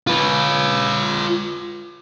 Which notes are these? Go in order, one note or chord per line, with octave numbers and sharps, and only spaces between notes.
F4 B4